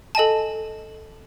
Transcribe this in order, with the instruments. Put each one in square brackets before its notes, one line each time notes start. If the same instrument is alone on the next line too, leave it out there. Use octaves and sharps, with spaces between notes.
[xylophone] A4 D#5 G#5 A5